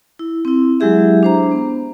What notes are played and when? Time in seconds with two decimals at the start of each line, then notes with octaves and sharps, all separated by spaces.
0.19 E4
0.45 C4 E4
0.80 F#3 G#3 E4 G4 G#4 E5
1.23 D4 C5 A#5
1.52 B3